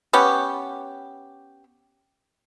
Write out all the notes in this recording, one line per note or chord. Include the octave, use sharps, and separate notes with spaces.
B3 C#4 G4